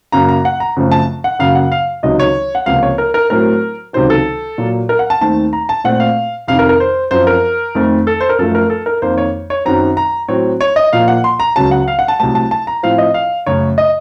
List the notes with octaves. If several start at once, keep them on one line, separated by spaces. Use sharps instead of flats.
F#2 C#3 F#3 A#3 A#5
A#5
F#5
A#5
F#2 C#3 F3 A3 C4
A5
F#5
F#2 C#3 F#3 A#3 F5
F#5
F5
C#2 C3 D#3 F#3 D#5
C#5
F#5
C#2 C3 F3 A#3 F5
C#5
A#4
A#4
A2 F#3 A3 C4 A#4
C#2 C3 D#3 F#3 C5
A4
A#2 F#3 A#3
A#4
F#5
A5
D#2 D#3 A3 C4 A5
A#5
A5
A#2 A3 C4 F#5
F5
F2 C3 D#3 F5
A#4
A#4
C5
F#2 F3 C4 C5
A#4
F2 D#3 A3 C4
A4
C5
A#4
F#2 F3 A3 A4
A#4
A4
A#4
F2 D#3 A#3 C5
C#5
C#5
F#2 D#3 F#3 C4 A#5
A#5
A2 F#3 C4 C#5
C#5
D#5
A#2 F3 A#3 F5
F#5
C6
A#5
C#2 C#3 F#3 A5
F#5
F5
F#5
A5
C2 C3 F#3 A3 C4 A5
A5
A5
A#5
A2 F3 C4 F5
D#5
F5
F#2 C#3 A3 C#5
D#5